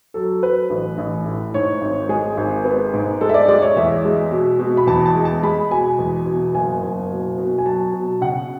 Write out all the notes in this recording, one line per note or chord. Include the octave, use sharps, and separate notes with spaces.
F#3 A4
F#3 B4
A1
A1
A2
G#2 C#5
G#1
G#3 G#4
G#1
B3
G#2
G#3 A4
E5
D5
G#3 D5
C#5
E2 E5
G#3
B2
B2
B5
E2 A5
A5
G#3
A5
G#3 B5
B2 G#5
E2
B2
F#1 G#5
F#1
B2
B2
G#5
F#3 A5
B2
C#3 F#5